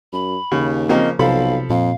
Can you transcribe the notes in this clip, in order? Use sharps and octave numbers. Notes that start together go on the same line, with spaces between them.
F#2 B5
D#2 C#3
C#3 F3 A#3 C4 D#5
B1 C3 F3 A4 F5 B5
F2 A#2 F5